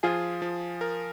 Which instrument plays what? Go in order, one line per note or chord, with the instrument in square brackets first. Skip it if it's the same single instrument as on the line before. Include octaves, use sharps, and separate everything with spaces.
[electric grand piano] F3 [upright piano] F4 G#4
[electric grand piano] F3
A#4